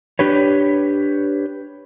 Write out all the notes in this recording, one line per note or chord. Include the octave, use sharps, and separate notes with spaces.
D4 G4 B4 C#5